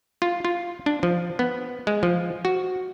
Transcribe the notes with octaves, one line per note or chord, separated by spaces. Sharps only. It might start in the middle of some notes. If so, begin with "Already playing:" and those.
F4
F4
D4
F3
B3
G#3
F3
F#4